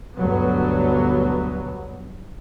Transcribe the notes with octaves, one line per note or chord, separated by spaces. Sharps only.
D2 G2 B2 F#3 B3